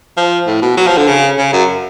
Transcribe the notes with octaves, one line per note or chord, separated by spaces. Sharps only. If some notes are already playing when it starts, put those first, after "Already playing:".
F3
A2
B2
F#3
F3
D3
C#3
C#3
F#2